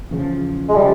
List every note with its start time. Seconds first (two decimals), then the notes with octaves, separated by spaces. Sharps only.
0.11 E2 C#3 F3
0.69 G#3
0.75 C#3 F3 G3